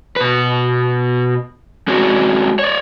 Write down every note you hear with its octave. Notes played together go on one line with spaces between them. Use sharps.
B2 B4
G#3 C4 C#4 F#4
C#5 D5